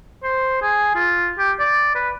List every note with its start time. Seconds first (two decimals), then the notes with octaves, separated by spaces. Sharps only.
0.23 C5
0.62 G#4
0.95 F4
1.39 G4
1.59 D5
1.95 B4